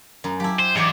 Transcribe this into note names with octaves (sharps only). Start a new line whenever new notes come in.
F#2 A3 A#5
F#3 E4 G4 F5 A5
C5
G#2 E3 D4 G4 G#4 B4 C5 D5